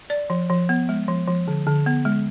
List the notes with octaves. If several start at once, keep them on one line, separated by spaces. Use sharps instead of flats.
D5
F3
F3
B3
G#3
F3
F3
D3
D3
B3
G#3